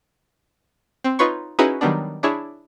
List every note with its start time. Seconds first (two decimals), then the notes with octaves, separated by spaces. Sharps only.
1.04 C4
1.19 D#4 F4 B4 C#5 C6 C#6
1.59 C#4 D#4 E4 F#4 G#4 B4
1.81 D#3 F#3 G3 B3 D4
2.23 D4 E4 G#4 C#5